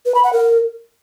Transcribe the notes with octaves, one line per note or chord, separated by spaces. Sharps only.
B4
B5
F#5
A#4